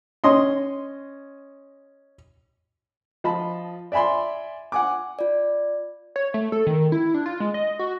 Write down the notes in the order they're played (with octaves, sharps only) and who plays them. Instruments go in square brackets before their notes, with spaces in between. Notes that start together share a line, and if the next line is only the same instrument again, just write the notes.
[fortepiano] C#4 D#5 C6
F3 D#5 A5 B5
D5 E5 G#5 B5 C6
F#5 G#5 D6
[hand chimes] F4 D5
[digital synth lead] C#5
A3
A4
D#3
E4
D4
F4
G#3
D#5
F#4